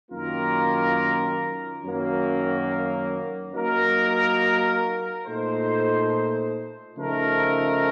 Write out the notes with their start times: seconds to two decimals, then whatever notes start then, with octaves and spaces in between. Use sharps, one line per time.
0.11 F#2 D#3 A#3 F4 A#4
1.83 F#2 D#3 F#3 A#3
3.54 F#3 A#3 D#4 F#4 A#4
5.25 A#2 A3 D#4 A4 C5
6.96 C#3 F3 A3 D#4 A#4